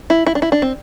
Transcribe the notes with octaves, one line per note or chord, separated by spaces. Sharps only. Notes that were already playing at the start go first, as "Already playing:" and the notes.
E4
E4
D4
E4
D4
C4